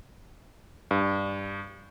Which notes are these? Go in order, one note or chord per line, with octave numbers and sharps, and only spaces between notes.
G2